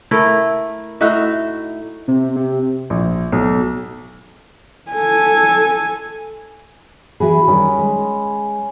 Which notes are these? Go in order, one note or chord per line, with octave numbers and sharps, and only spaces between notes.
A3 E4 A#4
A2 D#4 F#4 E5
C3
C3
A#1
B1
A4 G#5
E3 F#4 G#4 B4
D#3 G3 C#4 D#6
G#3